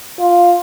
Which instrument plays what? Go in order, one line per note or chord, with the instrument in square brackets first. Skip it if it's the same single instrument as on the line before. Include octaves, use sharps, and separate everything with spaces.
[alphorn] F4